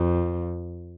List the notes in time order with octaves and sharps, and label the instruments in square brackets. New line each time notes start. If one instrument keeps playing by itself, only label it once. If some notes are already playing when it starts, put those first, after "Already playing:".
Already playing: [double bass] F2